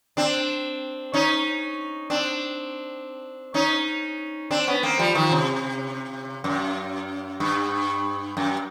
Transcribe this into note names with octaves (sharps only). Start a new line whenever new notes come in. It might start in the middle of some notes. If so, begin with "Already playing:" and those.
C4 D4
C#4 D#4
C4 D4
C#4 D#4
C4 D4
B3 C#4
A#3 C4
F3 G3
D#3 F3
C3
F#2
G2
F#2